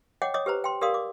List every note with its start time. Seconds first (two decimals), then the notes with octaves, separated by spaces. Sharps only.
0.22 C#5 D#5 F#5 G5 D6
0.34 C#5 D#5 D6 D#6
0.46 G4 B4 C5 A#5
0.64 G5 C6
0.81 G4 A#4 D5 F5 C6 D#6
0.94 D6